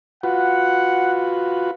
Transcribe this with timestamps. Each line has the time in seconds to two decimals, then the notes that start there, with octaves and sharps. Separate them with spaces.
0.23 F4 F#4 B4 F#5